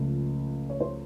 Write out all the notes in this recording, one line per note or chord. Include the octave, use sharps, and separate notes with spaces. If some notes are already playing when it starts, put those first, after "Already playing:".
Already playing: C#2 C#3 F3 A3
C#5
C5